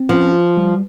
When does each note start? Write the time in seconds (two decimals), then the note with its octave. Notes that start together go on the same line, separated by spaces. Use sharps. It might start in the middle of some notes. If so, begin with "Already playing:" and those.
Already playing: C4
0.09 F3 C#4
0.32 F4
0.57 G3